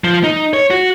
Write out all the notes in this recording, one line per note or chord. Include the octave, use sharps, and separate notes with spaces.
F3
D#4
C#5
F#4